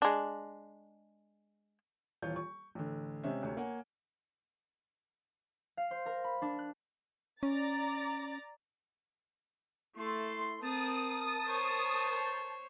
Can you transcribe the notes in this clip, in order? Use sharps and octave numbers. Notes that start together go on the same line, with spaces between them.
G#3 D4
D#1 E3 F4 C#5 G6
C#6
A1 D3
C3 G#3 C4 C#4 E5
D2 C3 C#5
A#3 C#5 F#5 G#5
F5
C5
A#4
B5
D4
F#6
C#4 D5 A#5 A6
A3 E4 A4 C6
C4 A#4 A5 D#6
C5 C#5